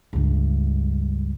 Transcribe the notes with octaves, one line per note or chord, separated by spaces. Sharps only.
C#2 G2